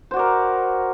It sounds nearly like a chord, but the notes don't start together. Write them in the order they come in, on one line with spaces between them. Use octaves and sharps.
C5 F#4 D5 A#4